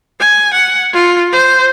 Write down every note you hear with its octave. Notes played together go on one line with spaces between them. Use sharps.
G#5
F#5
F4
C5